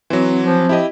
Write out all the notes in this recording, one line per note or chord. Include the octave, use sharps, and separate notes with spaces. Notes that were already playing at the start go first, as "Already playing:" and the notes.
E3 F#3 C4
F3
E4 G4 D#5